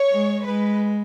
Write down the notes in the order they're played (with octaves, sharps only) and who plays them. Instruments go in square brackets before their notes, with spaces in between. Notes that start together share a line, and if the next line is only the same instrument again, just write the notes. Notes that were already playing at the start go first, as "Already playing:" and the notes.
Already playing: [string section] C#5
[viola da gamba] G#3
[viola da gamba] G#3 [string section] B4